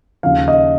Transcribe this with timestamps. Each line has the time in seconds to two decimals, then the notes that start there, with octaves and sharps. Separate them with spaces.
0.23 D#2 C#3 F3 F5
0.48 D#5